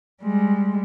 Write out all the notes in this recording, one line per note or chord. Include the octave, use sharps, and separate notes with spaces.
G3 G#3